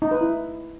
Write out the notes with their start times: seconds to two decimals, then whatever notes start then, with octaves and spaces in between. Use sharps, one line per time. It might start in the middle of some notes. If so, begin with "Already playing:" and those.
0.02 D#4
0.11 B4
0.21 E4